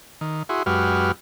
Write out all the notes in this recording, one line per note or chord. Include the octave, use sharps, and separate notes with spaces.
D#3
E4 F#4 G#4 C6
F#2 G#3 F#4 G4 B4 F6